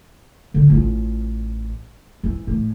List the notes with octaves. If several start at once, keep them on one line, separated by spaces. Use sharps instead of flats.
D3
A1 F4
E3
A2